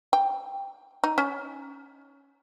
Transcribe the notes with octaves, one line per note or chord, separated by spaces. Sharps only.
G5
D#4
C#4